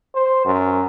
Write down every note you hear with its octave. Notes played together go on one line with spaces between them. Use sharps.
C5
F#2